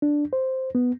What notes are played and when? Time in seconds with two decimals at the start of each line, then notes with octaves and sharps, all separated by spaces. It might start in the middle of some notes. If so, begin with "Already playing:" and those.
0.02 D4
0.33 C5
0.75 B3